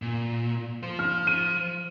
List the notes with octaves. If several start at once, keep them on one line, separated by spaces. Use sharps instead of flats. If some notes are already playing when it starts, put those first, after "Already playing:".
A#2
F3 C5
F6
D#7